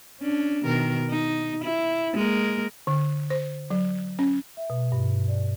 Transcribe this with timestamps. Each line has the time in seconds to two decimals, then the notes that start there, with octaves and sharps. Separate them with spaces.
0.21 C#4 D4
0.63 B2 D#3 A#4
1.10 D#4
1.64 E4
2.14 G#3 A#3 A#4
2.87 D3
3.30 C5
3.70 F#3
4.19 C#4
4.57 E5
4.70 B2
4.92 G2
5.28 D5